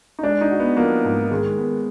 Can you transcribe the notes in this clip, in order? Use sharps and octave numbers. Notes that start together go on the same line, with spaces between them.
D#4
G#3 D4
D#4
F#4
B3
F3 A#3
G#2
D#3 G#3
B3